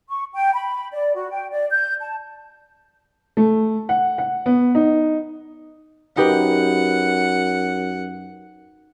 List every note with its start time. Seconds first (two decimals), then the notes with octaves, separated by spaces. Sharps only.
0.09 C#6
0.34 G5
0.54 B5
0.92 D5
1.15 F#4
1.30 G5
1.52 D5
1.71 G6
2.01 A5
3.37 A3
3.89 F#5
4.18 F#5
4.46 B3
4.75 D#4
6.17 F#2 D#4 G4 B4 F#5